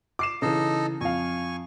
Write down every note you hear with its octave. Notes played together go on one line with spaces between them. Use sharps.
D6 C7 E7
C#3 E3 D#4 A4 D#5
F2 F5 G#5 C#6